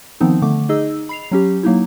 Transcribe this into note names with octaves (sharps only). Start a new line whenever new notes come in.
D#3 F3 B3 C4 D#4
D3 A3 D6
D#4 G#4 D#5 E6
B5 C7 F7
F#3 C#4 G4
F#3 A#3 D#4 E4